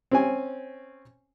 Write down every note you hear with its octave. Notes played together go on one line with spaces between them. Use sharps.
C4 C#4 G#5